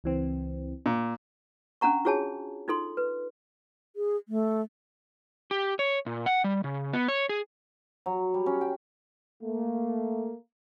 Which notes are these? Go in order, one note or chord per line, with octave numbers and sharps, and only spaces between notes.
C#2 E3 C4
A#2
C#4 D4 F#5 A#5 C#6
F4 F#4 G#4 C#5 G#5 A5
D#4 F4 A4 C6
B4
G#4
A3
G4
C#5
A#2
F#5
G3
C#3
B3
C#5
G#4
F#3
G3
C#4
G5
A3 A#3